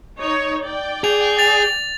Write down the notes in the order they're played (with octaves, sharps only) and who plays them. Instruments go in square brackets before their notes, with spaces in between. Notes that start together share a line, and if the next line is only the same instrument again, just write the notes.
[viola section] D#4 C#5
D5 G5
[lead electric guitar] G#4 [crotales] F7
[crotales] A6 F7